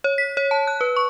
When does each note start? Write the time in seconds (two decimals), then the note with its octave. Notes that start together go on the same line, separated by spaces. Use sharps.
0.04 C#5
0.18 B6
0.37 C#5
0.51 A5
0.67 F#6
0.81 B4
0.96 C#6